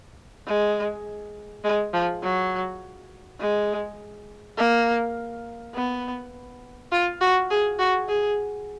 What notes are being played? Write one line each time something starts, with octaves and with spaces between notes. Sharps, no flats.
G#3
G#3
F3
F#3
G#3
A#3
B3
F4
F#4
G#4
F#4
G#4